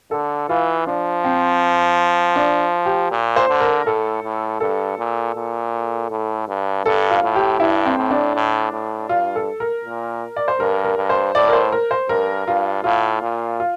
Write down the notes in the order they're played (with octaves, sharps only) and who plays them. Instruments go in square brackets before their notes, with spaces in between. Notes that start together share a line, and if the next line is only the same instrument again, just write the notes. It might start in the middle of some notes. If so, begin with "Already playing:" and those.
[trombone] D3 [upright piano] A4
[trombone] E3 [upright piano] F4
[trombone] F3 [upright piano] D4
[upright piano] C4
D4
G4
[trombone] A#2
[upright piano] C5
[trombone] D3
[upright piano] A#4
[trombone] A2 [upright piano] A4
[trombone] A2
[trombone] G2 [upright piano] A4
[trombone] A#2
A#2
A2
G2
[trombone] G2 [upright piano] A4
[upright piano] F4
[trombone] A2
[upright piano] G4
[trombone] G2 [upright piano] E4
[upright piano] C4
[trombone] A2
[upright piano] D4
[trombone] A2
A2
[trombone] G2 [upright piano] F4
[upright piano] A4
A#4
[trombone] A#2
[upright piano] D5
C5
[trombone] G2 [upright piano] A#4
[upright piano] A#4
[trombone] G2
[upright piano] C5
[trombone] A2 [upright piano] D5
[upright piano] A#4
C5
A#4
C5
[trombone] G2 [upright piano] A#4
[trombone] G2 [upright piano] F4
[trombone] A2 [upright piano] F4
[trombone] A#2
[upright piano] F4